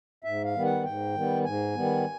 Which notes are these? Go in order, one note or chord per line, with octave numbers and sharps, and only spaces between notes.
G#2 E5
F5
D#3 G3 B3
F#5
G#2 G5
D#3 G3 B3
G#2 G#5
D#3 G3 B3